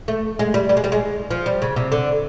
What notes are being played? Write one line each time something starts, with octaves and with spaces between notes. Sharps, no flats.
A3
G#3
G3
G3
G#3
G3
G#3
F3
G3
C#3
C3
D3